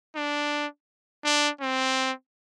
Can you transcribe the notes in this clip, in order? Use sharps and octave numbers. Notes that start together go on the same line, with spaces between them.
D4
D4
C4